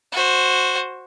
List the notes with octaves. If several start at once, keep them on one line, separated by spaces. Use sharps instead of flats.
F#4 C5